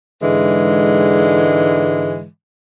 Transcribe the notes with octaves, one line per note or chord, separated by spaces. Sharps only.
G#2 D3 E3 G#3